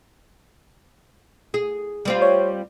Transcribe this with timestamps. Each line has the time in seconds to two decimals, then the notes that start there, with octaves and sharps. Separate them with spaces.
1.54 G#4
2.05 G3 C4 F4
2.22 C#5